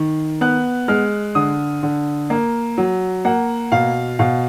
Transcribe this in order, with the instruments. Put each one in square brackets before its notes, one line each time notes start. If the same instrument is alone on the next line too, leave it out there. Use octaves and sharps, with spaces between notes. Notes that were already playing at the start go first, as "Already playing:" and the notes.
Already playing: [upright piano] D#3
B3 F#6
G#3 F6
D3 D#6
D3
A#3
F#3
A#3 F#5
B2 F5
B2 F5